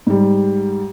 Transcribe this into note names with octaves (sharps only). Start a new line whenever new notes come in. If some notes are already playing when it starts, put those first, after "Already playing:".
G#2 G3